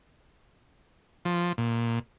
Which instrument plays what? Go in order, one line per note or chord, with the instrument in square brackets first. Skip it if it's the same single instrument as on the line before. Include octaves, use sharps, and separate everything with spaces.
[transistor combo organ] F3
A#2